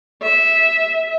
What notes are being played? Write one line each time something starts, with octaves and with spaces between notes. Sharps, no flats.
E5